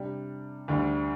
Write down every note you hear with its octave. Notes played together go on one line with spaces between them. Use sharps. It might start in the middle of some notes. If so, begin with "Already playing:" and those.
Already playing: C3 G3 D4
D2 D3 G3 D4